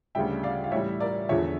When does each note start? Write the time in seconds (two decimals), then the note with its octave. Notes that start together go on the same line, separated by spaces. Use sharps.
0.15 D2 C#3 G3 E5 G5
0.43 D5 F5
0.64 F5
0.72 A2 E3 G3 C#5 E5
1.00 A#4 D5
1.29 E2 D3 F3 C#5 E5